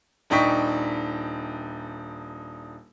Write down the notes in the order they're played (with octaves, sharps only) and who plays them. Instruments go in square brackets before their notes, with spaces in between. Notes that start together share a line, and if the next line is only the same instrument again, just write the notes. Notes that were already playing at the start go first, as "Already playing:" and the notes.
[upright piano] D#1 D4 D#4 G5 C#6 B6